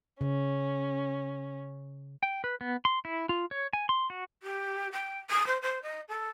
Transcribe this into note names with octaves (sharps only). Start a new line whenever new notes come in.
C#3 C#4
G5
B4
B3
C6
E4
F4
C#5
G#5
C6
F#4
G4
G5
D#6
C5
C5
D#5
A4